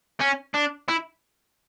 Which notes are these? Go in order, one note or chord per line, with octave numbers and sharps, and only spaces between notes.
C#4
D4
E4